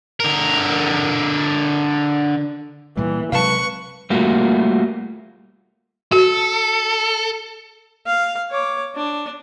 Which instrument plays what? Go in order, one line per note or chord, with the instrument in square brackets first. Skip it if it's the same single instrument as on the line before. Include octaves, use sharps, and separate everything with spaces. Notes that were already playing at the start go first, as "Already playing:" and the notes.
[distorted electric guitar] D3 A#4
[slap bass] A#2 G3 [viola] E3
[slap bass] C3 F#3 G#3 [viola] B4 [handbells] F5 A5 [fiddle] C#6
[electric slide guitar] G3 A3 A#3 F4 F#4
[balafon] F#4 [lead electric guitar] A4
[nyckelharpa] F5
C#5 D6
D4